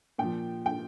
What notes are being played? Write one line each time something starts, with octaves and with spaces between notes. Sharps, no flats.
A#2 F3 G5
G5